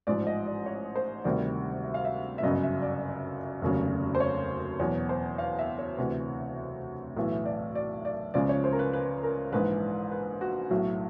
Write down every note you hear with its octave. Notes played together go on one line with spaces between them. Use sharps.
A1 G#2 F3 D5
D#5
D5
C#5
C5
D2 C3 D#3 G3 D5
E5
F5
E5
E5
G1 F#2 C#3 D#5
E5
D5
F1 D#2 C#3 F#3
C5
C#5
E2 B2 F#3 C#5
C5
F5
E5
C#5
D2 C3 E3
B1 A2 E3
D5
D5
D5
C#2 C#3 F3 D5
C#5
C5
A#4
B4
B4
A#4
A#1 G#2 E3 B4
B4
F#4
B1 A2 F#3